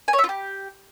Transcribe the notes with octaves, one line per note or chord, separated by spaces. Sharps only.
G#5
C#5
E5
F4
G4